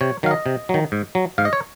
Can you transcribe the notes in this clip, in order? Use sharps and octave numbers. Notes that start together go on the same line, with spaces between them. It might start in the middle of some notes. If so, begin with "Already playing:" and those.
C3 C#5
D#3 F#3 F5
D#5
C3
D#3 F#3
G#2
F#3
G#2 F5
D#5
C#5